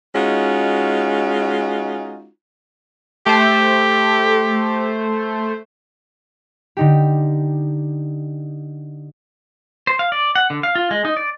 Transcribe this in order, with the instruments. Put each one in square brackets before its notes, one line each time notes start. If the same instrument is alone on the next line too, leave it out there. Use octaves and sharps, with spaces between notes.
[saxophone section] G#3 C#4 D#4 F4 F#4
[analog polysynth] A3 C5 [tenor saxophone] G4
[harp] D3 D#4 G4
[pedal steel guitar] C5
F5
D5
F#5
D3
F5
F4
G#3
D#4
D5